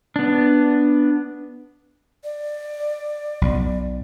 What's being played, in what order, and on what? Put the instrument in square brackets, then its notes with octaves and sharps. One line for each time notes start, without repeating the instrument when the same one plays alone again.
[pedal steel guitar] B3 D4
[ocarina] D5
[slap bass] B1